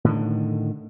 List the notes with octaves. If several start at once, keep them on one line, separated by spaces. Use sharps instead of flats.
A2 D3 D#3